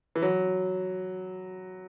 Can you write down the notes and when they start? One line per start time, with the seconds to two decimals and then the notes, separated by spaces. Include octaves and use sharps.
0.15 E3
0.22 F#3